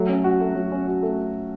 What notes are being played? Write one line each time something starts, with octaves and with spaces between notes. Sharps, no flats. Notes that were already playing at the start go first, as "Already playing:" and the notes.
Already playing: F#3 A3
C#4
F#4
A3
F#3
C#4
F#4
A3